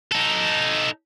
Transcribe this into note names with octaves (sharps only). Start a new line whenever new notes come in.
D#4 A4